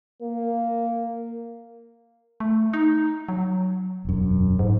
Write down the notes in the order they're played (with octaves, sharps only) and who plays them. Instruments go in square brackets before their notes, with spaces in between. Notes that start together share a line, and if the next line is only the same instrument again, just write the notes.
[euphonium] A#3
[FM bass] A3
D#4
F#3
[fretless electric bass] E1 F#2
[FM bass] G#2